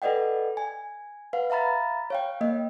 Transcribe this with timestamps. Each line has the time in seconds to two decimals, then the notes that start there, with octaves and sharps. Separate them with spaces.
0.02 A4 B4 D5 D#5 F#5 G5
0.57 G#5
1.33 B4 F5 F#5
1.50 E5 F5 A#5 B5 A6
2.10 C#5 F5 G5
2.41 A#3 D#5